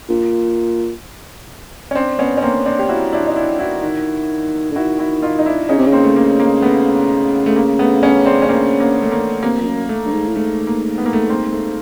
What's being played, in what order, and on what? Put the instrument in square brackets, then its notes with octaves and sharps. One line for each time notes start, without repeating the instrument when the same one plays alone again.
[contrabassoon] A#2
[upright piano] C#4
C4 D4
B3 C#4
C#4
A#3 C4
C4 D4
G4
E4 F#4
D4 E4
D#4
D4 E4
E4 F#4
[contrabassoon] D#3
D3
[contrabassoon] D#3 [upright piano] E4 F#4
[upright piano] E4 F#4
D#4 F4
D#4
D4 E4
[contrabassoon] C#3 [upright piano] C#4 D#4
[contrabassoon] C3
C#3
[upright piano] A#3 C4
A3
A#3
A#3
A3 B3
A3
A#3
A3 B3
B3 C#4
C4 D4
C#4
A#3 C4
A#3
A3
A#3
[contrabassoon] C3 [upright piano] A#3
[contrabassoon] F2
F#2
[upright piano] A3
[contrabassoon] G2
G#2
A2
[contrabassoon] G#2 [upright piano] A3
[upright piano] A#3
B3
A#3
A3 B3
A#3 C4
A3